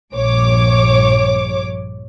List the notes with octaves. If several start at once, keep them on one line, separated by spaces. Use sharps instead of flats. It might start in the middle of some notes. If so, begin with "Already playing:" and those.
A#1 G2 C#5 D6